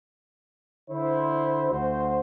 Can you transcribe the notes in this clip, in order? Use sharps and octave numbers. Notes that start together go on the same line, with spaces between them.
D3 E4 C5
D2 F#4 C5